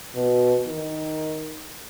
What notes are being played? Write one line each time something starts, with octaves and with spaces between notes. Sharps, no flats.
B2
D#3